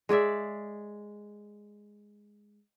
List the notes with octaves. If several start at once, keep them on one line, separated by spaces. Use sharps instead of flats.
G#3 G#4 D5 E5